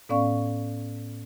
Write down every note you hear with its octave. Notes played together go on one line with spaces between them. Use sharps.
A2 B3 C#4 D5 F5 C#6